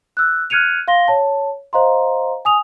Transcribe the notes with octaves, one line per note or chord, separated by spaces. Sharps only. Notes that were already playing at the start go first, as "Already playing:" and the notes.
E6 F#6
F6 F#6 G#6 C#7 D#7 F7
F5 C6 A#6 G7
C#5 A5
C5 D#5 F5 A#5 C6
G#5 D#6 F7